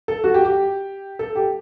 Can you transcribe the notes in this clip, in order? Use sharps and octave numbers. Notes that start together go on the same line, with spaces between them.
A4
F#4
G4
G4
A4
G4